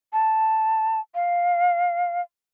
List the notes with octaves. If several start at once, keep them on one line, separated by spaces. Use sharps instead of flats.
A5
F5